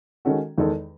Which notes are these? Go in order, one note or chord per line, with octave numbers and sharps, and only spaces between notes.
D#3 G#3 C#4 F#4 A4
E2 D#3 G#3 D#4 A4